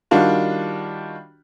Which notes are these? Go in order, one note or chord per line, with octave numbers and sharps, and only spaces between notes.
D#3 G3 D4 F4 F#4